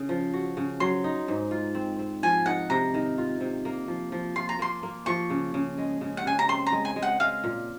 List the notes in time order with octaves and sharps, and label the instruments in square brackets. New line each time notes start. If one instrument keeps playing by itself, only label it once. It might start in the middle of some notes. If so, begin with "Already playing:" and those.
Already playing: [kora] C#3
F3
F#4
C#3
[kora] F#3 [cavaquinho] C6
[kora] D#4
G#2
F4
C4
C4
[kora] F3 [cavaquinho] G#5
[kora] D#4 [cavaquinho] F#5
[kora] C3 [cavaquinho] A#5
[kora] D#3
F4
C3
A#3
F3
F3
[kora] F4 [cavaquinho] C6
[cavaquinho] A#5
[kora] A#3 [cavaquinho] C6
[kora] A#3
[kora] F3 [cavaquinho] C#6
[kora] C#3
C#3
G#3
C#3
[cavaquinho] F#5
[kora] C#3 [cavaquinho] G#5
[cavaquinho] A#5
[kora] C4 [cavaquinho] C6
[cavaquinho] A#5
[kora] G#3
[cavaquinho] G#5
[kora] G#3
[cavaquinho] F#5
[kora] G#3 [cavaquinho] F5
[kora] A#2